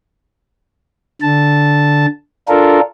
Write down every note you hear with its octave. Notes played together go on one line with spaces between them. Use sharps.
D3 A5
D4 F4 A4 A#4